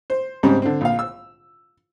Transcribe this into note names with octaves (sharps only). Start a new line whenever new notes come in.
C5
G#2 C#3 G3 C4 C#4
D3 C4
A#1 F5
E6